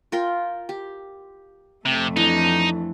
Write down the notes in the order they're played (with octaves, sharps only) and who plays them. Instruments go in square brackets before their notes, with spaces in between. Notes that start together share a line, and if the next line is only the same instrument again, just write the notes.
[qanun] F4 A#4 G5
G4
[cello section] F2 A3 [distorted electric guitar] C3
[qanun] E3 D4 [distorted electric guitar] D#4